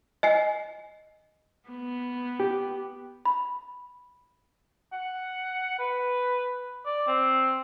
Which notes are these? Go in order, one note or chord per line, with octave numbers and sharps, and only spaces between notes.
D#5 G#5 C7
B3
G4
B5
F#5
B4
D5
C4